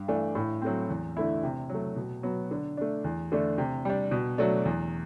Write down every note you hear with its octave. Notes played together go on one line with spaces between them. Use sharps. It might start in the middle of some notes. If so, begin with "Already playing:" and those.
Already playing: G2
E3 A3 D4
A2
F#3 A3 C4
E2
D3 A3 E4
C3
F#3 A3
B2
F#3 B3
D3
A3 D4
E2
D3 A3 D4
C3
G3 D4
B2
F#3 A3 D4
E2